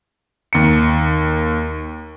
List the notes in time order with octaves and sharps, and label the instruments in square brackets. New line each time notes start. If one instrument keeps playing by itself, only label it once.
[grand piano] D#2 C#7